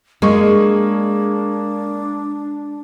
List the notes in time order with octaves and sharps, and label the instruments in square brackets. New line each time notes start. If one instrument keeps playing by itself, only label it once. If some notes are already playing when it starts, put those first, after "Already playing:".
[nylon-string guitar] G#3 [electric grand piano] A#3 G#4 C#6 [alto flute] D4